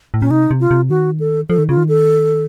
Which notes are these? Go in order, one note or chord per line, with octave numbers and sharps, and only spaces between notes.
A2
A#2 C#4
C3 D#4
C3
F4
C3
D#3 F#4
A4
F3 A4
D#3
C#3 F4
D#3
A4